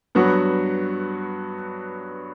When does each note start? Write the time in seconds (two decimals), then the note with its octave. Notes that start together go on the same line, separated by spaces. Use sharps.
0.15 G2 F#3 B3 F#4